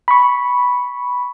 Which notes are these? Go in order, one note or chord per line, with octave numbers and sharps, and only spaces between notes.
B5 C#6